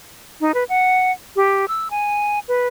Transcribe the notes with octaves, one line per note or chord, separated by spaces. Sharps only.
D#4
B4
F#5
G4
E6
G#5
B4